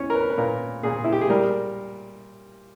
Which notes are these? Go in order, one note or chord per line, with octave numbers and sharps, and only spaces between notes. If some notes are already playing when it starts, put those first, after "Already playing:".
Already playing: C#4 C#5
A#4
B4
B4
A#2 A#4
A#2 G#4
E4
G4
G#4
G3 A#4